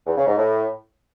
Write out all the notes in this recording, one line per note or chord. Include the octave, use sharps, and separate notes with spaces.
E2
C#3
G#2
A2